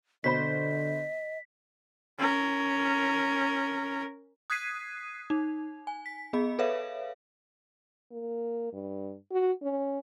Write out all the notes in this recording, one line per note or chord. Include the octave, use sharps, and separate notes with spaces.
B2 D3 C5 D#5 B5 B6
C#4 A#4
D#6 F#6 G#6 B6 C7 D#7
D#4
G#5
B6
B3 G#4 D#5 B5
A4 B4 C#5 E5 F5
A#3
G2
F#4
C#4